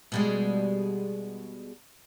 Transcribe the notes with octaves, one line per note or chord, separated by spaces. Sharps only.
B2 G3 G#3